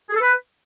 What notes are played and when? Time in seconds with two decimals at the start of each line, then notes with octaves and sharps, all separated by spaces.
0.10 G#4
0.15 A4
0.20 B4